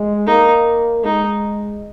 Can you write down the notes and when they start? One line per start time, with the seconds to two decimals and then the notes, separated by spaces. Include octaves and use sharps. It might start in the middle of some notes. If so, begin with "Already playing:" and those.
Already playing: G#3
0.27 A#3 D#4
1.04 G#3 D#4